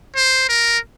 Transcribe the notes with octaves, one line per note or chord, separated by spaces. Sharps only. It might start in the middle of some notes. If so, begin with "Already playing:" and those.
C5
A#4